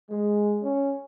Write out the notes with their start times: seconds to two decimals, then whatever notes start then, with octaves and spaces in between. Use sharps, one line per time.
0.10 G#3
0.62 C#4